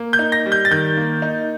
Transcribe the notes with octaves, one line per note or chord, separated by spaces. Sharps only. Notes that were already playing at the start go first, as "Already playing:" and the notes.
Already playing: A#3
G6
D#4
A#6
G3
G6
A6
D#3 G6
A#3
D#4